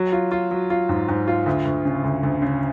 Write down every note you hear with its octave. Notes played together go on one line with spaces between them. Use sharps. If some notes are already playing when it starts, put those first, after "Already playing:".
Already playing: F#3
F4
F4
F#3
F4
G#2
G#2
F4
D2
D2
C#3
D2
D2
C#3